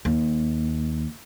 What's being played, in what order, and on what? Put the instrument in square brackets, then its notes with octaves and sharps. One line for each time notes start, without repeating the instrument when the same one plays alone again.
[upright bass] D#2